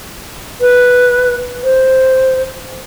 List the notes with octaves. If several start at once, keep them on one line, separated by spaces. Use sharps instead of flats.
B4
C5